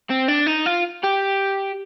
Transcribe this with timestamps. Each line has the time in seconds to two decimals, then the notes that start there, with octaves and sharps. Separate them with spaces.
0.10 C4
0.28 D4
0.46 D#4
0.66 F4
1.03 G4